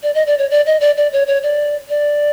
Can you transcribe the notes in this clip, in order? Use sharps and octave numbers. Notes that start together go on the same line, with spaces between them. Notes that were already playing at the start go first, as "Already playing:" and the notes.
D5
D#5
D5
C#5
D5
D#5
D5
D5
C#5
C#5
D5
D5